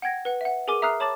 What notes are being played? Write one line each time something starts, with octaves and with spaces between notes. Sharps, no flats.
F#5 G5 G#6 A#6
B4 F#5
E5 F#5
G#4 A#4 G#5 D6 D#7
E5 A#5 D#6 F6 F#6 C7
C#5 A5 B5 D6 A6 E7